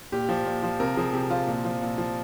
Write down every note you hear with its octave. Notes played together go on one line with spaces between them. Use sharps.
A#2 G4
F3
A#2
F3
C3 A#4
F3 G#4
C3 G4
F3 F4
A#2
F3
A#2
F3